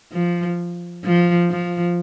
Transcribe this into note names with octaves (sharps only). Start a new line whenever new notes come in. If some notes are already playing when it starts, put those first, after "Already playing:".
F3
F3
F3